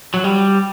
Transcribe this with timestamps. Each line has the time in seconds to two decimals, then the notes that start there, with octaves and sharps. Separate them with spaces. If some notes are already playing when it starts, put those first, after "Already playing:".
0.14 F#3
0.24 G3